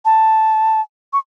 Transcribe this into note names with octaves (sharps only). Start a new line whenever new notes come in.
A5
C#6